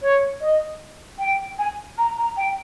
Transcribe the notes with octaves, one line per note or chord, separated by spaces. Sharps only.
C#5
D#5
G5
G#5
A#5
A#5
G5